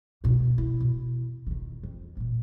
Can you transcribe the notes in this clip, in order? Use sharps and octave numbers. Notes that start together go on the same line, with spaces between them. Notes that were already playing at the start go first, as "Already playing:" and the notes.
C#2 B2
E4
B2
F2 D#3
F2
A1 A#2